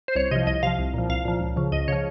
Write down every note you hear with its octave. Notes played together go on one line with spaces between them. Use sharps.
C5
C2 C#5
C3 F3 D#5
C2 D#5
C3 F3 F5
C2
A#2 F3
C2 F5
A#2 F3
C#2
C#3 F3
C#2 D#5
C#3 F3 C#5